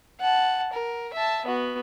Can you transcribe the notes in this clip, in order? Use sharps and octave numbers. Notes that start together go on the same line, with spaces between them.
F#5 A5
A#4
E5 A5
B3 F#4